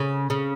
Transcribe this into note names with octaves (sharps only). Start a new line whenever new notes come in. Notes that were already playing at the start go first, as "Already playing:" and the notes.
Already playing: C#3
C#3